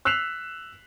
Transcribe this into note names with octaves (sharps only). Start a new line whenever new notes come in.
E6 F#6 B6 C7 E7 F7